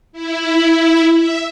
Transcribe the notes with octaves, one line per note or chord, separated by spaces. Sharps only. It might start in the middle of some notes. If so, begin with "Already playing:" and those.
E4
E5